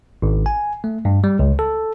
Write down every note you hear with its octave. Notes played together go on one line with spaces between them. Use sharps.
G#1
G#5
A3
G2
G3
C#2
A4